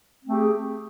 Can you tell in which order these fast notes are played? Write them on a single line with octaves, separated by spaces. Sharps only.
C4 A3 G4 G#4